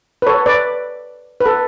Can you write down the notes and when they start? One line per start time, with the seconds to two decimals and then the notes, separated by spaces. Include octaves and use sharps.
0.22 B4
0.26 A4 C#5
0.46 B4 D5
1.41 B4
1.46 A4